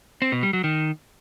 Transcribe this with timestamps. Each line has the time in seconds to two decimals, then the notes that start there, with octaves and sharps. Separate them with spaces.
0.22 C4
0.32 B2
0.43 G3
0.53 F#3
0.64 D#3